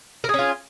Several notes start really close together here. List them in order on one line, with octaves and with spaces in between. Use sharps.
A#4 G#4 C#4 F4